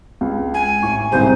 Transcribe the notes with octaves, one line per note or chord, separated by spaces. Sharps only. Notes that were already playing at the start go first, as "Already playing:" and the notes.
C#2
G#5
A1 C#6
C2 G#2 C3 C5